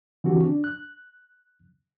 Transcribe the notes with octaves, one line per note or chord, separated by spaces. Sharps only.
D3 E3 C4 F#4 G4
D4
F#6